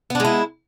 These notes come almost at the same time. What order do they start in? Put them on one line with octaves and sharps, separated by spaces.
B3 D4 G#3 E4